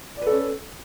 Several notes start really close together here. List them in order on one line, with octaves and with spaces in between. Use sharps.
D5 B4 A4 C#4